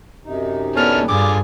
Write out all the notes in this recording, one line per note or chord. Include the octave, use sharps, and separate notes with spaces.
F#2 C3 D#4
B3 C#4 D4 A4 F6
G2 D3 F4 G#4 D6